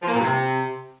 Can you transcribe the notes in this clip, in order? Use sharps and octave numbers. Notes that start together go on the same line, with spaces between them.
F3
A#3
A#2
G2
C3